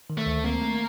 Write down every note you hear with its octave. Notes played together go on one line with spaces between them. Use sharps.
D#3
A3
D2
A#3 C4
A3